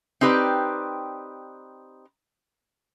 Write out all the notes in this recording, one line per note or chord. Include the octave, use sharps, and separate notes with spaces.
C4 D#4 G4 B4 D5